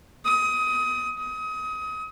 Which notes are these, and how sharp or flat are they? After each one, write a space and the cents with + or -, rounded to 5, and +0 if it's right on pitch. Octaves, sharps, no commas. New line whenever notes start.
D#6 +25
D#6 +30